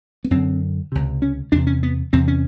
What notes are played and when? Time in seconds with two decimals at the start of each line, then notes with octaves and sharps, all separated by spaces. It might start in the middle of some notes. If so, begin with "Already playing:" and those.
0.24 B3
0.31 F#2 D3 C4
0.92 C#2 C3
1.22 C#4
1.52 E2 D4
1.56 C3
1.67 C#4
1.83 B3
2.13 E2 C3 C4
2.28 C#4